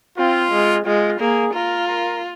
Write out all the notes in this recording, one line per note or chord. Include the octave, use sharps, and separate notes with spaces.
C4 F4
G#3
G#3 F4
A#3 G#4
F4 A#4
A#4